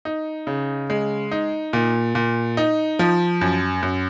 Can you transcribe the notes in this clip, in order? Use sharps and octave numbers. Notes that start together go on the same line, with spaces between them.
D#4
C#3
G#3
D#4
A#2
A#2
D#4
F3
F#2
F#2